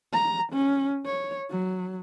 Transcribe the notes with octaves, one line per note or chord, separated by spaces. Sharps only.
A#5
C#4
C#5
F#3